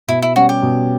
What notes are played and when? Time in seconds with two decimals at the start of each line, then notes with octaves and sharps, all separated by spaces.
0.08 B2 E4
0.22 E4
0.36 G3 C#4 F#4 G4
0.49 G4
0.62 B2